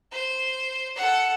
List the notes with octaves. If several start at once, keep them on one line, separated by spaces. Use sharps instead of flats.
C5
A4 F#5